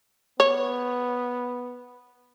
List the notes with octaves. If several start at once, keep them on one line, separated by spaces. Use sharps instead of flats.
B3 C#5